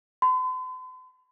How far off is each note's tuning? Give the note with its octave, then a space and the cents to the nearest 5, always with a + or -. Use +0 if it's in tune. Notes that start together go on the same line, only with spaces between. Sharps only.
C6 -45